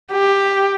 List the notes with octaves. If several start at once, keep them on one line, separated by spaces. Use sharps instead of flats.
G4